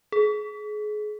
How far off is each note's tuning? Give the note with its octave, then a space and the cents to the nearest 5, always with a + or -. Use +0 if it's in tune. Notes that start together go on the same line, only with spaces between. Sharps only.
G#4 +30